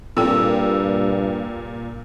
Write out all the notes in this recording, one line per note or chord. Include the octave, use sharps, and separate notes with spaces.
G2 A#2 C4 A4 G5 E6